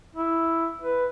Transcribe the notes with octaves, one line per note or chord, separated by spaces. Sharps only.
E4
B4